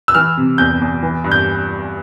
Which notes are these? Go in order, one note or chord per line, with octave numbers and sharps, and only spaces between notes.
E6
E3 F6
C3
E2 G6
E2
E3
G2
G6